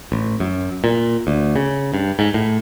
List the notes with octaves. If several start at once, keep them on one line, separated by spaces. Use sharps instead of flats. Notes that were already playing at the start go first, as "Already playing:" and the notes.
A1
F#2
A#2
D2
C#3
G2
G#2
A2